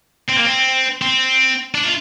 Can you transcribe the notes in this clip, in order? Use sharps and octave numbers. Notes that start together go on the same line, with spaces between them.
C4
A#3
C4
C4
D4
F4